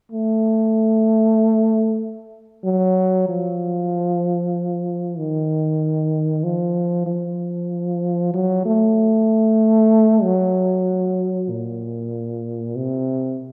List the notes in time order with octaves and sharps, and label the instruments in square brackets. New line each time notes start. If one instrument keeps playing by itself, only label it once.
[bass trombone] A3
F#3
F3
D#3
F3
F3
F#3
A3
F#3
A#2
C3